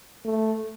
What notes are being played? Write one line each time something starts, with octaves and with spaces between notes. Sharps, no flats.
A3